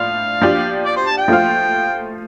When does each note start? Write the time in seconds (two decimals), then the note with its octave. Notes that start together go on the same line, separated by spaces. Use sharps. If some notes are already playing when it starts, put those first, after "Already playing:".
Already playing: A2 F3 D4 F4 F5
0.42 F3 D4 G4
0.85 D5
0.96 C5
1.07 A5
1.18 G5
1.28 F3 A3 F4 C5 F5